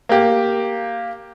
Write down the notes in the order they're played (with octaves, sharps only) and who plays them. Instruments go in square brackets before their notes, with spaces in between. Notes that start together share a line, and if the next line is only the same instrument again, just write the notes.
[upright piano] A#3 G4